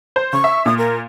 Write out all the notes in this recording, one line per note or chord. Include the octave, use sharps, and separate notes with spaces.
C5
C#3 C#6
E5
A#2 D#6
A#4